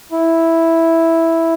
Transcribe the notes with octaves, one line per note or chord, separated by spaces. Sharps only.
E4